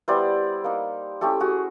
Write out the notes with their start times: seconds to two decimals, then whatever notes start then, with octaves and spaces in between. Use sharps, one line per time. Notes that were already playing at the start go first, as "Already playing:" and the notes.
0.08 G3 B3 E4 C5 D5
0.64 A#3 D#4
1.21 A3 C#4 E4 G4 A4
1.40 F#4 G#4